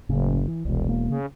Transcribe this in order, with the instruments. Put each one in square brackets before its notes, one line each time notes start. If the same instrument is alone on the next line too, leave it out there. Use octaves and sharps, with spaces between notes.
[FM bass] F#1 [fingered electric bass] A2 C#3
[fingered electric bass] E3
[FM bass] E1 [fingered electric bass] C2
[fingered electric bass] A#3
[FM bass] C#3